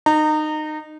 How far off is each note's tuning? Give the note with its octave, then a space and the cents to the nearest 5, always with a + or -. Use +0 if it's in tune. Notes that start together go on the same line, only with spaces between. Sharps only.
D#4 -20 A#5 -25